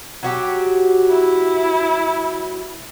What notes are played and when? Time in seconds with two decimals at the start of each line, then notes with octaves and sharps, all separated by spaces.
0.23 F#3 F#4 G4
1.09 E4